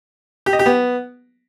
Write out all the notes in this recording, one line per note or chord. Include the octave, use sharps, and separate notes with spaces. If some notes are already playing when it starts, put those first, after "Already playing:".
G4
D#5
G4
B3